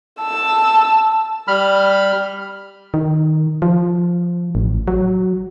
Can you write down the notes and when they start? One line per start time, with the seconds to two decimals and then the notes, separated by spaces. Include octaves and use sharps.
0.21 A5 E6
1.48 G3 B5 F6
2.94 D#3
3.62 F3
4.55 A1
4.88 F#3